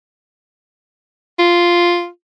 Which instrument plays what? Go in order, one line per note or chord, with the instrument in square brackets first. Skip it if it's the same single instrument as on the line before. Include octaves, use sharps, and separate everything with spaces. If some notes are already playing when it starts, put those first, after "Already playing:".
[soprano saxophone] F4